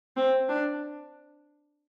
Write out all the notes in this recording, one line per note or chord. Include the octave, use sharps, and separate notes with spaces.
C4
D4